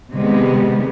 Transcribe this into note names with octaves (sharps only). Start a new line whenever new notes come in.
C3 D#3 G3 G#3 B3